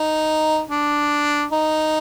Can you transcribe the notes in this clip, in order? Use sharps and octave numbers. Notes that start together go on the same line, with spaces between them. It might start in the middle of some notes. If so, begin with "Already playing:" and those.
Already playing: D#4
D4
D#4